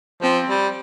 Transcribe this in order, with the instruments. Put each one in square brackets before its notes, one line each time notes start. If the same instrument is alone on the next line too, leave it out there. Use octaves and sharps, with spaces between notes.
[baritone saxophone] F3 [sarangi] C4
[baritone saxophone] G3